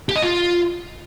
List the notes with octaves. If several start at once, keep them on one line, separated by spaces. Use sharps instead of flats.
G4
D#5
F4